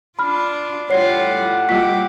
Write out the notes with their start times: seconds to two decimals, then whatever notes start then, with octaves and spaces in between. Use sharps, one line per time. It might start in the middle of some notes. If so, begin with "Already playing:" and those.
0.19 D4 F4 B5 F6
0.90 A2 G3 F4 G4 C#5 F#5 C7
1.69 G3 A#3 F4 G4 B6